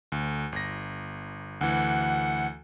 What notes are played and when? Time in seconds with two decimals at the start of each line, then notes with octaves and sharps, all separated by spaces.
0.12 D2
0.52 G1 A#6
1.61 D2 E3 F#5